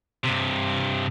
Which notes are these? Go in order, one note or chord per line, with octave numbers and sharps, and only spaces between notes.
G2 C3